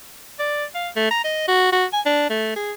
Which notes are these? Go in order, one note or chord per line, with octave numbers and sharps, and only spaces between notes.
D5
F5
A3
A#5
D#5
F#4
F#4
G#5
D4
A3
G#4